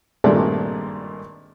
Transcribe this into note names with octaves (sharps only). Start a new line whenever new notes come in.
G#1 G2 A#2 G#3 A3 D5